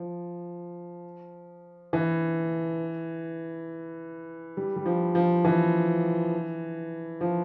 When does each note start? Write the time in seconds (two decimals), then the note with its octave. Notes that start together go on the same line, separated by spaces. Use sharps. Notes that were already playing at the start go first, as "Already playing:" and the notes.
Already playing: F3
1.93 E3
4.57 G3
4.76 G3
4.86 F3
5.15 F3
5.45 E3
7.21 F3